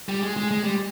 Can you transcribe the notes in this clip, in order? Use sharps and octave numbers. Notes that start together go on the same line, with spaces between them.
G3
G#3
G#3
G#3
G3